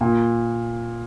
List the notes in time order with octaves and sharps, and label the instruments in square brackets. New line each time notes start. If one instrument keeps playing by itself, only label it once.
[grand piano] A#2